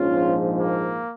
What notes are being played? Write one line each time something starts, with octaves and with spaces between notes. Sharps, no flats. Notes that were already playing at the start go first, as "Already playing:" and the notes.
Already playing: A#1 G#2 F3 C#4 F4
A#3